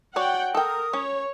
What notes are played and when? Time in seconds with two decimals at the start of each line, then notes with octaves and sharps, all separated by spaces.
0.16 F#4 C#5 D5 F#5 G5
0.55 A4 A#4 G5 D#6
0.93 C#4 C#5